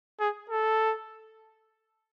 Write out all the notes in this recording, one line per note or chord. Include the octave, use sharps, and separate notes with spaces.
G#4
A4